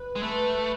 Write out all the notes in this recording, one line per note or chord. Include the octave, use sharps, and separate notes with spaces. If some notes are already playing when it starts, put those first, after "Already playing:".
Already playing: B4
G#3
A3